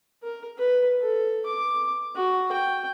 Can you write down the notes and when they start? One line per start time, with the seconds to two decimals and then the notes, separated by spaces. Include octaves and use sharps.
0.23 A#4
0.58 B4
1.01 A4
1.46 D6
2.16 F#4
2.52 G5